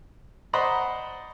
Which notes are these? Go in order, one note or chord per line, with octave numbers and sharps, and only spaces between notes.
C5 D5 D#5 F#5 A#5 B5